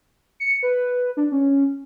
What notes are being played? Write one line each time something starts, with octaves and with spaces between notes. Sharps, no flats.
C#7
B4
D4
C#4